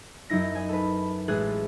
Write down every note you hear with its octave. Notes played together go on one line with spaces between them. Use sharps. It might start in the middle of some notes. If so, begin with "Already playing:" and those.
F#2 F#3 D#4 E4 A#6
D#5 G#5
A4 B4
A1 G#3 G#4 F#6 G#6 A6